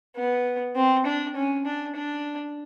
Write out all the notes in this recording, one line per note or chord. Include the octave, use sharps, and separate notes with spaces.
B3
C4
D4
C#4
D4
D4